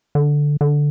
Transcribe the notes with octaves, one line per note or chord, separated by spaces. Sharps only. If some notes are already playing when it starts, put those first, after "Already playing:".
D3
D3